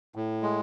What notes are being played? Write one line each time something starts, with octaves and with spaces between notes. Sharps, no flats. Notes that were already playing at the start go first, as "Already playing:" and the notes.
A2
G#3